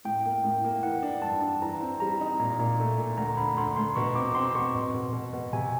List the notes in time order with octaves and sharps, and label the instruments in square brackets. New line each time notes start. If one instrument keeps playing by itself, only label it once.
[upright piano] A2 [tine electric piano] G5
[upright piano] A#3
A2
A#3
[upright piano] E3 [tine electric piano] F#5
[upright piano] D4
[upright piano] G2 [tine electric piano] A5
[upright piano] D4
[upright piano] E3 [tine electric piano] A#5
[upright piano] C4
[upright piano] G3 [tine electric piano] A#5
[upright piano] D#4
[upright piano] A#2 [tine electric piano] A#5
[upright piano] A#2
A3
A#2
[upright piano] D2 [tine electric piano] A#5
[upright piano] D2 [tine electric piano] B5
[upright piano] D2 [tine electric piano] C6
[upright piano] D2 [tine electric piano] C6
[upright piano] B2 [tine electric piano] C#6
[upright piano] C4 [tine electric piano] D6
[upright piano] C4 [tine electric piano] C6
[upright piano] B2 [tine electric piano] C#6
[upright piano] B2
B2
B2
B2
[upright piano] C3 [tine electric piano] G#5